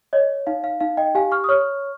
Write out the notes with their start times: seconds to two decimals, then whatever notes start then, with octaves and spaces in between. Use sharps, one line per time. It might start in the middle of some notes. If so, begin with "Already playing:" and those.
0.13 C#5 D#5
0.47 D#4 F5
0.64 F5
0.80 D#4 F5
0.97 D#5 G5
1.15 G4 F5 G#5
1.32 C#6 F6
1.44 D#6
1.49 C#5 C#6 F6